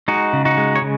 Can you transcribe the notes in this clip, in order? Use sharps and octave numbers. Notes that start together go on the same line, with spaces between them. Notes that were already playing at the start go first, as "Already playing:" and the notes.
G#3 D#4 F#4
C#3
D#4 F#4
G#3
C#5
C#3